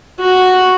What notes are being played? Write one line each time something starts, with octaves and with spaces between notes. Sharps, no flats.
F#4